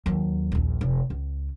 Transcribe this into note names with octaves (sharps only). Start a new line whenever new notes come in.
D#2 F#3
A#1 D#2
F1
C#2